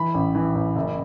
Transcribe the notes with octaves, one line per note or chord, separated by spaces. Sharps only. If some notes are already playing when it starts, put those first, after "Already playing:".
Already playing: E3 B5
A1
E3
A1
F#1